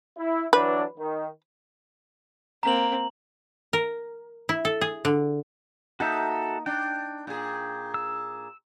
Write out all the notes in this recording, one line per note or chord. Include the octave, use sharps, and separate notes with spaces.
E4
E3 F#3 D4 B4
D#3
A#3 C4 A#5 F#7
A#4
E4
A4
G#4
D3
A#3 D#4 F#4 A4 E5
D4 G5
A#2 G#4
E6